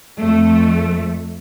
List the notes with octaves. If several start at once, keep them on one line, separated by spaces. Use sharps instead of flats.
F2 A3